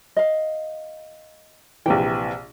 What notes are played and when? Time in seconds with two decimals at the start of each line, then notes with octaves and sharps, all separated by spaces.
0.16 D#5 F5
1.86 A#1 C3 E3 G5